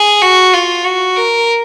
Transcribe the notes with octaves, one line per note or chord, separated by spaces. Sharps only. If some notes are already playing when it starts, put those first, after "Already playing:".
Already playing: G#4
F#4
F4
F#4
A#4